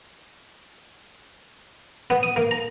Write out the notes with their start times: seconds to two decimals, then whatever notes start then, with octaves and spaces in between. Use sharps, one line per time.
2.10 B3
2.23 D#6
2.36 A#3
2.51 A#5